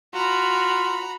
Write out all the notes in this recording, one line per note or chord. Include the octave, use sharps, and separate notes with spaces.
F4 F#4 A#5 B5